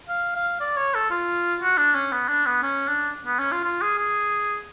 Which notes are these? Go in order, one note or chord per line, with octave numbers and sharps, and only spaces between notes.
F5
F5
D5
C#5
A4
F4
F#4
D4
C#4
B3
D4
B3
C#4
D4
B3
C#4
F4
F4
G#4
G#4